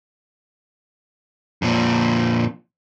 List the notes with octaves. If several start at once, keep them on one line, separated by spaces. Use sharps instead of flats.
F2 A#2